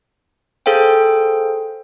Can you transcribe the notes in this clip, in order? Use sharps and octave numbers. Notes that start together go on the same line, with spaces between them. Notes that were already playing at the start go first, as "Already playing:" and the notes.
G#4 A4 C5 F5 G5